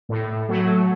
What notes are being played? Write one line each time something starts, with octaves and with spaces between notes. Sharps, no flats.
A2
F#3 A3